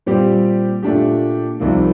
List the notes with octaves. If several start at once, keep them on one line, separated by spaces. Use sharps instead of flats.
A#2 G3 C4 G4
A#2 A3 D4 G4
C2 C3 F3 A#3 D#4